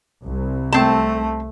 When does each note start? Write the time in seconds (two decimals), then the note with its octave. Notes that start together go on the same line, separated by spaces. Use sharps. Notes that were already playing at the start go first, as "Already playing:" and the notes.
0.23 C2
0.73 A3 C4 A5